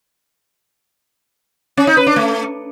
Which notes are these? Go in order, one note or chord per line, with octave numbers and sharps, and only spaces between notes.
C#4
D#4
B4
D4
A3